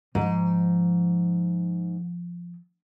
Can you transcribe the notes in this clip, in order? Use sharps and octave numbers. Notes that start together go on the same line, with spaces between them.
G#2 F3